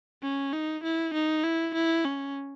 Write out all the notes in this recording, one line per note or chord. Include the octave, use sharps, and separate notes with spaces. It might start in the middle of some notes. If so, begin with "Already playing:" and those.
C#4
D#4
E4
D#4
E4
E4
C#4